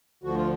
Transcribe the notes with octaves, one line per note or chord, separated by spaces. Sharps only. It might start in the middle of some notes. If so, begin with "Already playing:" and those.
D2 D3 F3 F#4
F4